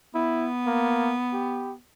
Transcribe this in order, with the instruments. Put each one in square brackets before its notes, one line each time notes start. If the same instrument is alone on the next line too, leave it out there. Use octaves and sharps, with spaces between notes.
[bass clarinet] B3 [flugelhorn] E4
[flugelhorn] A#3
G4